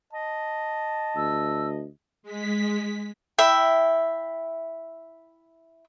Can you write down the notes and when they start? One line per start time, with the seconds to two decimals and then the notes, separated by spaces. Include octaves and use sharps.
0.13 D#5 A5
1.17 D2 E6
2.23 G#3 B6
3.38 E4 E5 G5